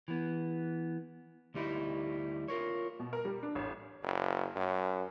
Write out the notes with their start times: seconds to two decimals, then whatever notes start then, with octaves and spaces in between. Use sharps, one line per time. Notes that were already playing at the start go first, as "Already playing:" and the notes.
0.08 E3 B3
1.54 D2 G3 D#4 E4
2.48 F4 A#4 C#5
2.99 B2
3.13 A#4
3.25 G3
3.43 D4
3.55 A1
4.03 F#1
4.56 F#2